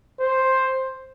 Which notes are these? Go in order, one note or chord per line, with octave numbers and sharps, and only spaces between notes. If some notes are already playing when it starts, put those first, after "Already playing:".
C5